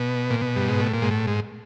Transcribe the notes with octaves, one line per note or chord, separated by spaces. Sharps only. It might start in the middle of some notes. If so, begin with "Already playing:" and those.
Already playing: B2
A#2
B2
G2
G#2
A2
A#2
G#2
A2
G#2